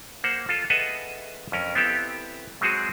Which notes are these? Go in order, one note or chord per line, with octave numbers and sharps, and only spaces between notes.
A#3 C5 F#5
F4 A4 A#5
G#4 A4 B4 D#5 E5 F#5
F2 C#4 A#4
B3 C4 E4 G4 A4
F#3 G#3 C4 F#4 G#4